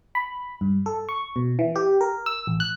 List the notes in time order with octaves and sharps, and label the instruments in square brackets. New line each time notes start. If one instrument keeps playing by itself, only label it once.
[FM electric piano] B5
G2
A4
C#6
B2
E3
G4
A#4
E6
A1
F#6